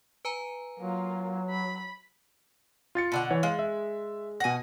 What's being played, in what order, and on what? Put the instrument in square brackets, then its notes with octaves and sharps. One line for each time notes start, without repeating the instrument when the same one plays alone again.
[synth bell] B4 G#5 A#5
[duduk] F#3 [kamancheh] A#3 F4
[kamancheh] B5
[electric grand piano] F4 A6 C#7
[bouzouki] B2 D3 F#5
[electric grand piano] E3 C#5
[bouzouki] G#3 [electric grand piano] F5
[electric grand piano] E5
[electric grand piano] B2 A#6 [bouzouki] F#5 G#5